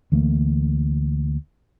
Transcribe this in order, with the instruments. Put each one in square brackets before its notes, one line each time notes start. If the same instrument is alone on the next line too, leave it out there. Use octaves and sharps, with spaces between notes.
[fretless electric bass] D2 E3 A3 A#3